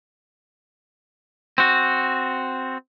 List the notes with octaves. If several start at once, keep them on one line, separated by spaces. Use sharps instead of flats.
C4 F#4